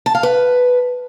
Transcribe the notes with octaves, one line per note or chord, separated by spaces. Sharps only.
A5
F5
B4